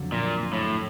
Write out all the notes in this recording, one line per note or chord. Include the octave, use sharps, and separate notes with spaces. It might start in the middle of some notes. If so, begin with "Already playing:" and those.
Already playing: F2 D3 F#3
A#2
A2